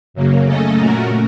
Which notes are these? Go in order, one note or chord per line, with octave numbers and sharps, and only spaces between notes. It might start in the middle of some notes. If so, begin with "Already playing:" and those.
F#2 C#3 F#3 A#3
C#3 A3 C#4 A4 D#5
A#2 A3 C#4 F#4 A#4